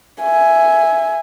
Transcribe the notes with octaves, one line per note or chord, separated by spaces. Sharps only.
E5 G#5